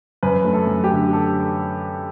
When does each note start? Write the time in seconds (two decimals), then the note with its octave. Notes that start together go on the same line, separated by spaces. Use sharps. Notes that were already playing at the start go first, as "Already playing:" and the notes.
0.23 F#2 B4
0.45 A3
0.53 A4
0.67 F#2
0.84 G4
0.90 D3
1.13 A4